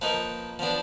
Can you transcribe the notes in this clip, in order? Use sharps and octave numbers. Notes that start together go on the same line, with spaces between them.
F3 A#3 D#4 B4
F3 B3 D4